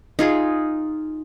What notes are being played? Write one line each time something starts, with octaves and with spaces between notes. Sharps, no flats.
D#4 F4 G#4